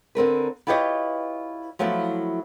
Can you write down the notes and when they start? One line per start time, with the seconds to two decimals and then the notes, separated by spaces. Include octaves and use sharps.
0.15 D3 C4 A#4 B4
0.67 E4 F4 G4 B4 C#5 D#5
1.79 F3 F#3 A3 B3 E4 F4